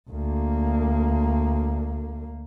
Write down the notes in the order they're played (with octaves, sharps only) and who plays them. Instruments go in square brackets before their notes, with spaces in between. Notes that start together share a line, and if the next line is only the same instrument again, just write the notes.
[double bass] D2 A#3